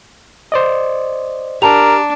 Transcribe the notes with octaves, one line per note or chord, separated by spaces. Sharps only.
C5 D5 D#5
D4 G4 A#4 A5 A#5 F7